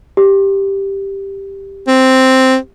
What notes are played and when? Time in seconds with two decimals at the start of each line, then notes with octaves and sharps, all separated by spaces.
0.17 G4
1.88 C4